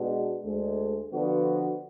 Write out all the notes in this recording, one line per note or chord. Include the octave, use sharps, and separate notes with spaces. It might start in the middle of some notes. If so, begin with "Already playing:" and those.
Already playing: B2 G#3 D4 F#4
D2 D3 G#3
D3 F3 B3 D4 F#4